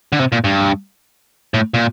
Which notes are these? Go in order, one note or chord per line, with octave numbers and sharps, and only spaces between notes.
D3
C3
A#2
G2
A2
A#2